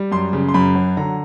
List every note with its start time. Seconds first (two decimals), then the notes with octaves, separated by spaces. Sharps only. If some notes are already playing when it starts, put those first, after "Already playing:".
Already playing: G3
0.11 F#2 C6
0.33 C#3
0.49 C6
0.54 F#2 B5
0.75 F#3
0.97 D3 A#5